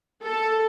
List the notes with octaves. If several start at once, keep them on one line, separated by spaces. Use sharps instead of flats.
A4